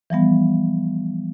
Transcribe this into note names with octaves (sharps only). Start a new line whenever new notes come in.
E3 F3 G3 B3